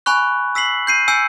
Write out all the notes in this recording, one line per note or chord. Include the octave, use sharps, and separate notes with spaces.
G#5 B5 C#6 F#6
E6 B6 C7 F#7
G6 C7 D#7
G#5 E6 G6 C#7